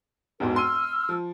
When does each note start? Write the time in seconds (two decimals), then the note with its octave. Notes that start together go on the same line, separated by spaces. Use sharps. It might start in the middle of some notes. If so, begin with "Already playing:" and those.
0.40 E1 G#2 B2 A#4
0.56 C6 E6 F6 D#7
1.09 F3